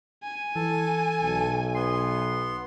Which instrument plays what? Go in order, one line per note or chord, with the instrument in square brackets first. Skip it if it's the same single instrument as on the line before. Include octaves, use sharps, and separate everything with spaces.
[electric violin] G#5
[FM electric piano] E3 [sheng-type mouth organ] A4 A5
[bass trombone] B1
[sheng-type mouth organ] B3 C6 [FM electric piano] C7